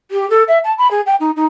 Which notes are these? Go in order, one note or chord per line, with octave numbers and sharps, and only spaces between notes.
G4
A4
E5
A5
B5
G#4
G5
D#4
D#4